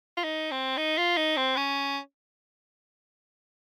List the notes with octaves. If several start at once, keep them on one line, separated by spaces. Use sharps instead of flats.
F4
D#4
C4
D#4
F4
D#4
C4
C#4